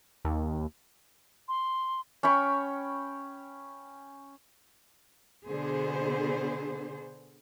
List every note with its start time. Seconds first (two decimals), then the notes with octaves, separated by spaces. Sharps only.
0.25 D#2
1.48 C6
2.23 C#4 G5 B5 C#6
5.47 B2 D3 B3 G#4 C5